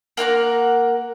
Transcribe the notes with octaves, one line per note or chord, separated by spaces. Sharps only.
A#3 A#4 F#5 D6